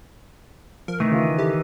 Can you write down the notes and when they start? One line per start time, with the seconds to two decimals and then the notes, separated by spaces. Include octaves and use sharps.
0.88 F3 A#4
1.00 C3 D#3 E3 A3
1.12 C#3 F4
1.38 C#3 E4 G4 A4